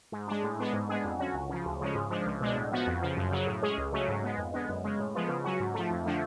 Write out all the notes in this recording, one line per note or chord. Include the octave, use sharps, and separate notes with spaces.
G#2
G#3 D4
A2
G#3 B3 D4
G#2
G#3 B3 D4 G#4
F2
D3 F#3 C#4 F#4
C#2
C#3 F3
D2
C#3 F3 G#3 C#4
G#2
F3 G#3 D4
C#2
B2 G#3 D4
A2
F3 B3 F#4
F2
C#3 F3
F#2
C#3 F#3
A2
G#3 C#4 G#4
C#2
C#3 F#3 A3 C#4
G#2
G#3 B3
F2
D3 G#3 B3
F#2
C#3 G#3
A2
F3 G#3 B3 F4
C#3
F#3 C#4 F#4
G#2
F3 A3
F2
D3 F3 A3